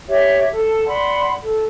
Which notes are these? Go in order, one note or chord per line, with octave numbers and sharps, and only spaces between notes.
G4 C#5 E5
A4
D5 F#5 B5 C6
A4